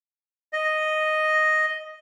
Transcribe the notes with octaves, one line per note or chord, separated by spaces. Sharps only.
D#5